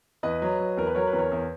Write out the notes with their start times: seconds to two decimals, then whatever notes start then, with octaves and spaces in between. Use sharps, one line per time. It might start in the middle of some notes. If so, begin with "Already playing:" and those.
0.23 E2 B4 D#5
0.42 F#3
0.59 F#3
0.77 E2 A#4
0.87 B4
0.95 F#3 A#4 C#5
1.07 B4
1.13 E2
1.18 A#4 C#5
1.32 E2